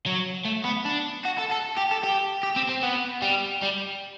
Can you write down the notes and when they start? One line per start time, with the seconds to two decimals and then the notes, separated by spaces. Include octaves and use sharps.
0.06 F#3
0.45 A3
0.65 B3
0.86 D4
1.25 F#4
1.38 A4
1.51 A4
1.77 G4
1.91 A4
2.03 G4
2.43 G4
2.56 C4
2.69 C4
2.83 B3
3.22 G3
3.62 G3